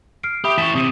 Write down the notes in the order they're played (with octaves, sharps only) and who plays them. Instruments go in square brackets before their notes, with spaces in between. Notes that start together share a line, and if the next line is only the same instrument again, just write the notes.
[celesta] F6 C7 D7
[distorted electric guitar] G4 [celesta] E5 B5 D#6
[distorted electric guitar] E3 A5 [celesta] C#6 B6
[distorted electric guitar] C3 [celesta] D#6 D#7